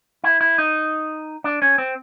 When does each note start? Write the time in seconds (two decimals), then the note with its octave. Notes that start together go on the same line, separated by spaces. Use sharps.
0.24 E4
0.41 E4
0.58 D#4
1.44 D4
1.62 C#4
1.78 C4